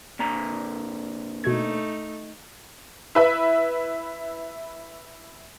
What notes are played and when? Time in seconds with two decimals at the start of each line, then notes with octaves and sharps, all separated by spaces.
0.19 A#2 D3 A#5
1.44 B2 A3 D#4 G#6
3.15 E4 B4 E5